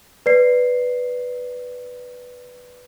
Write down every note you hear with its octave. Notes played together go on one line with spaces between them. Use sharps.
B4 D5 C7